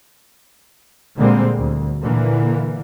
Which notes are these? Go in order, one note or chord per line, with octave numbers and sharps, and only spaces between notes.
A#2 D3 G3 G#3 A#3 C4
D2
A#2 D3 E3 A#3